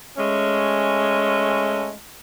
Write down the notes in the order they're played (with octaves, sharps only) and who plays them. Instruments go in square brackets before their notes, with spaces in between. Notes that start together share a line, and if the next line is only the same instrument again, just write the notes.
[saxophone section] G#3 A3 C#4